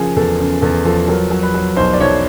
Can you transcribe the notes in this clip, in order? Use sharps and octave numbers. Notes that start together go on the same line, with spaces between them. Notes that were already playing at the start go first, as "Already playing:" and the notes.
Already playing: C#3 F3 G#4 A#4
E2 A4
C#3
E2 A4
F3 A4
F#3 A#4
F#3
B4
F#3
B1 C5
D5
B1 C#5